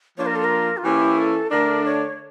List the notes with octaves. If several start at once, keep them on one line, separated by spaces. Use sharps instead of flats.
F3 A#3 D4 F4 C#5
A#4
A4
A#4
F4
E3 A#3 C#4 E4 G4
A4
D3 A3 D4 A#4
C#5